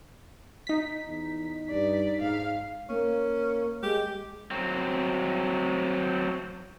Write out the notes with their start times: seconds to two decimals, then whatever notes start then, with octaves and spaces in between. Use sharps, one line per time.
0.67 D#4 B6
1.06 E2
1.70 G2 D5
2.22 G#2 F5
2.89 A#3 C#4
3.83 G#3 G4
4.51 F#3 C4